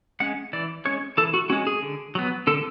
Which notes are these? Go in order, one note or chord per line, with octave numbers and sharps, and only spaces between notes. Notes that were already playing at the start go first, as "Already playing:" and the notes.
G#3 C#4 F#5
E3 D5
G#3 C#4 C#5
E3 A4
F#4
G#3 C#4 F#4
G#4
D3
F#3 B3
D3 A4